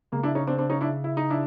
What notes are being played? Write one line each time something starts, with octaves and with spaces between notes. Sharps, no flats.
C#3 G#3 A#3
D4 E4
C#4 D#4
C4 D4
C4 D4
C#4 D#4
D4 E4
E4
D#4
D4 E4